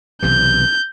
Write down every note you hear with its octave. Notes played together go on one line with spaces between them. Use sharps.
B1 C3 E3 G6